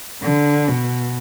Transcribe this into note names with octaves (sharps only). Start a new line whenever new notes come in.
D3
B2